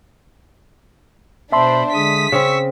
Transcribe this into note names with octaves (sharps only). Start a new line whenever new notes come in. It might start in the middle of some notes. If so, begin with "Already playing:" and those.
B2 D4 C5 E5 A5 B5 C6
D3 G#3 D#6 B6
C#3 C4 C#6 E6